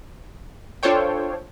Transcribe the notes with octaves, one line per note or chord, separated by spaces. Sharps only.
D4 F4 A4 C5 C#5 G5